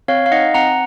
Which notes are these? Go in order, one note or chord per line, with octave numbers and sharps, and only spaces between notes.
C4 C#5 F5
F5
D#4 D#5 F#5
C4 F#5 A#5